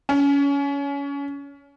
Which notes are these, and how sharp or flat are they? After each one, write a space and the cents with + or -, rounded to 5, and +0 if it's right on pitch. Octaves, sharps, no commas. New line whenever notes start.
C#4 +25